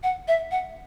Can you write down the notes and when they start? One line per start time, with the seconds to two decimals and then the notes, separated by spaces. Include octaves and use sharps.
0.03 F#5
0.28 E5
0.51 F#5